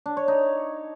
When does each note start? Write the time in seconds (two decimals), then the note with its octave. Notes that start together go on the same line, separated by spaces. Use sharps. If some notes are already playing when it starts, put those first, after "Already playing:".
0.06 D4
0.17 C#5
0.28 D#4